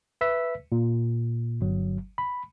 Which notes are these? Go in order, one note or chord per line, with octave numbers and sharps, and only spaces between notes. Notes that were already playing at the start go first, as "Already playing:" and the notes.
B4 E5 E6 B6
A#2
G1 F#3
B5